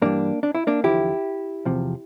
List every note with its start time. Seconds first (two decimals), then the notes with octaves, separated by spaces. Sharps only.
0.02 G2 E3 G3 A#3 D4
0.43 D4
0.55 E4
0.67 A#3 D4
0.84 E2 D3 F3 E4 G4
1.65 E2 C3 F3